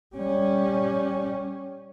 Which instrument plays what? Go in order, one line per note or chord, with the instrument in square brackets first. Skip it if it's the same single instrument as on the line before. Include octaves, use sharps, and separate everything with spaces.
[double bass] G3 C#4